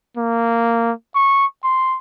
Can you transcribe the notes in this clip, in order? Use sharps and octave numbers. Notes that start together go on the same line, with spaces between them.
A#3
C#6
C6